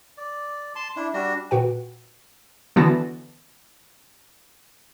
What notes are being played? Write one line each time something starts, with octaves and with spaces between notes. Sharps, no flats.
D5
A5 C6
D4 E4
G3 D4 F#4
A#2 F#4 B4 F#5 G5
D3 E3 B3 F#4 A5 A#6